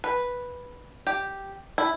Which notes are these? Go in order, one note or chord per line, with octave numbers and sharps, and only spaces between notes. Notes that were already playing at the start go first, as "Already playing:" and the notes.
B4
G4
E4